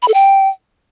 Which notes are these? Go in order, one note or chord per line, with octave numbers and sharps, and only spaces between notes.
B5
A4
G5